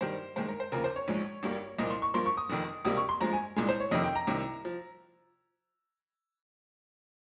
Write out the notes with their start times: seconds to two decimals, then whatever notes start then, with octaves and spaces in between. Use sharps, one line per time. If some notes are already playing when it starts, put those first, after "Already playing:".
0.01 G2 D#3 G3 C5
0.36 G2 D#3 G#3 C5
0.48 A#4
0.60 C5
0.72 D#2 C#3 F3 A#3 A#4
0.84 C5
0.96 C#5
1.08 A#1 G#2 F3 G#3
1.43 G#1 G2 G3 A#3
1.79 C2 A#2 F3 A#3 D#5
1.90 C6
2.02 C#6
2.14 G2 F3 A#3 C6
2.26 C#6
2.37 D#6
2.50 F1 F2 D#3
2.85 C#2 C3 G3 A#3 D#6
2.97 C#6
3.09 C6
3.21 G2 F3 G#3 A#5
3.33 G#5
3.56 C2 A#2 G#3
3.69 C5
3.80 C#5
3.91 F2 C3 D#3 D#5
4.04 G5
4.15 A#5
4.27 C2 C3 D#3
4.65 F3